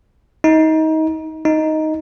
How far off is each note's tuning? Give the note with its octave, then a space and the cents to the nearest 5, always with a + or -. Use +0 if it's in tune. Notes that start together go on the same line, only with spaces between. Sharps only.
D#4 +25
D#4 +5